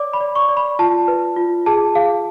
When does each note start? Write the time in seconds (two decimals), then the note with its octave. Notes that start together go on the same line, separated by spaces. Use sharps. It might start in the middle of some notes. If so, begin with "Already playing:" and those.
Already playing: C#5 D5 D6
0.13 B5
0.21 D5
0.35 C#6
0.49 D5
0.57 B5
0.79 F4 A5
1.08 B4
1.36 F4
1.66 G#4 A5
1.95 G#4 F5